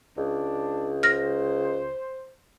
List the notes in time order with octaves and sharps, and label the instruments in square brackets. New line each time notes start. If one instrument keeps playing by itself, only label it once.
[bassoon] C#2 [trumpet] D4
[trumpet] C5 [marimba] F6 A#6